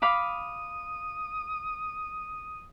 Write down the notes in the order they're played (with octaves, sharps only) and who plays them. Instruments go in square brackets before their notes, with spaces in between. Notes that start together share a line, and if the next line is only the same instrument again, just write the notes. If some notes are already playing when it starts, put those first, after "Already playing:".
[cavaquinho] F5 B5 D6 [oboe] D#6